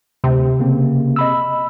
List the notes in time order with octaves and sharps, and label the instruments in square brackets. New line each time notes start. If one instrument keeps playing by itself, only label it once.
[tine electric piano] D2 [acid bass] C3
[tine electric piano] C#3 A#3 C4
D#5 B5 E6